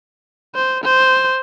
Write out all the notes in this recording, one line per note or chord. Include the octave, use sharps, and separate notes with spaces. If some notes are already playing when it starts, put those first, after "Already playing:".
C5
C5